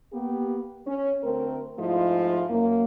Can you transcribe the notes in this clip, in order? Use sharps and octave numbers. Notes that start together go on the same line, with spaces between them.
A#3 B3 G4
C#4
D2 A3 C4 A#4
G#2 F3 G#3 A3 E4 F4
F#2 A#3